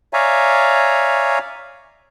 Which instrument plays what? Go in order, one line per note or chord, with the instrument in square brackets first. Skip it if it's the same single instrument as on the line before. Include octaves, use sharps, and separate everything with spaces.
[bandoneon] C#5 D5 E5 F5 G#5 A#5